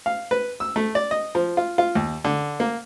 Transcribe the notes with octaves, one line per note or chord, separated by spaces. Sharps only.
F5
B4
E6
A3
D5
D#5
F3
F4
F4
D#2
D3
A#3